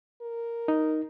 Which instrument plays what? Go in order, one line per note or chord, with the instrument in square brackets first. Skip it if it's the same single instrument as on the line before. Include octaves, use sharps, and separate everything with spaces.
[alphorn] A#4
[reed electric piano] D#4